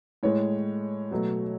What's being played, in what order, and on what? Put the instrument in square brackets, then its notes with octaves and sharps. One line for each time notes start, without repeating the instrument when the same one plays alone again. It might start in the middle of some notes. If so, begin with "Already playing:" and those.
[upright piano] A2 G#3 C#5
B2 F#3 A3